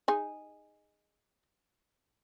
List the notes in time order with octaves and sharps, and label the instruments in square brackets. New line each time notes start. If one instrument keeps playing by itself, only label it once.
[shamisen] D#4 G#4